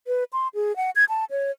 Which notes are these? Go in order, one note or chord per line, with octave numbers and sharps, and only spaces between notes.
B4
C6
G#4
F#5
G#6
A5
C#5